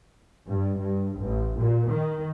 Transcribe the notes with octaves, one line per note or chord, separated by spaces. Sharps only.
G2
G2
A1
A#2
D#3